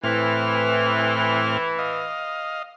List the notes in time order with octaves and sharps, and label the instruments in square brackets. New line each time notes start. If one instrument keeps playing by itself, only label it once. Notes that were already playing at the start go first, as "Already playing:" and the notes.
[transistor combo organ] A2 C4 F6 [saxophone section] E3
[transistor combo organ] D#5 F5